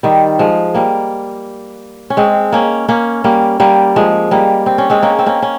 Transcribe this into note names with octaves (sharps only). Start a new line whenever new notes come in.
D#3 G3
F3 G#3
G3 A#3
C#4
G#3 C4
A#3 C#4
A#3 C#4
G3 A#3
G3 A#3
F3 G#3
G3 A#3
C4
C#4
G#3 C4
A#3 C#4
C4
A#3 C#4
C#4